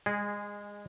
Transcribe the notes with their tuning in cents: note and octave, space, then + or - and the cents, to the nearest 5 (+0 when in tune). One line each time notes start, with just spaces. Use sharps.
G#3 -20 G#4 +0